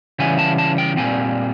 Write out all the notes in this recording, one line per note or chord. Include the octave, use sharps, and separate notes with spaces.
C#3 E3 G3 B3 G#5
A5
A5
G5
A#2 G3 C4 G#5